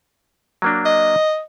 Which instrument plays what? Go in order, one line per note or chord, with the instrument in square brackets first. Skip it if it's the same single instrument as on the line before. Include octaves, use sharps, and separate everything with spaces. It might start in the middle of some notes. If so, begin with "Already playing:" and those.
[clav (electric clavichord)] F#3 A#3 D4
[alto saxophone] D#5